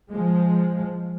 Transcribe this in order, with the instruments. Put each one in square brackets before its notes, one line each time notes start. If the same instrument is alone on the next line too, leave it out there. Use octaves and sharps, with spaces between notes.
[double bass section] F3 G#3